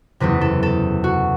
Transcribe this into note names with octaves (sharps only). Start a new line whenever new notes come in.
F#1 E2 C3 B4
A4
A4
F#4